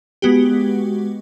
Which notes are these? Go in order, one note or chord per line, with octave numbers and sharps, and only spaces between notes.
G#3 B3 F#4 G4